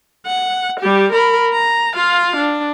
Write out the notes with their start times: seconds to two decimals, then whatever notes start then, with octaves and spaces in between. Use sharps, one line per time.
0.26 F#5
0.80 G3 G4
1.12 A#4 B5
1.53 A#5
1.95 F4 F5
2.37 D4